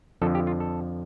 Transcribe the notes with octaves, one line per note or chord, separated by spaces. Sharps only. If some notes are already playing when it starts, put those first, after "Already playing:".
F2 D3 F3 A4
G4
F4
A4